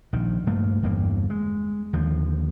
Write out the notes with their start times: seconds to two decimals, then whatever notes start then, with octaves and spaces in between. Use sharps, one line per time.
0.13 A#1 D#3
0.47 G2 A3 A#3
0.83 G1 E2 G2 A#3
1.30 G#3
1.93 D#2 D3 F3